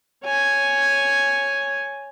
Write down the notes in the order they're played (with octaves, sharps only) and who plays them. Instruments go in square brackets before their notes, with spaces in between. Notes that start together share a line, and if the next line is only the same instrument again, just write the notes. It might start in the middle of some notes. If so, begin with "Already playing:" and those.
[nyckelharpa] C#5 G#5